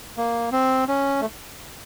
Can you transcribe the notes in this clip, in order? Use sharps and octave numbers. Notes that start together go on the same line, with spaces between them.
A#3
C4
C#4
A3